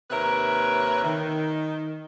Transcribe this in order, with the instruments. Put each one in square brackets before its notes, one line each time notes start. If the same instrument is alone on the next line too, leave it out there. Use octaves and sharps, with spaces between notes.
[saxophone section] D#2 C3 A#4 B4 C#5 E5
D#3